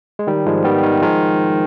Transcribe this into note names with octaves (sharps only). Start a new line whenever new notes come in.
G#3
D#3 G3
G#2 F3 G#3
D#3 G3 B3
D#3
D#3 F3 G#3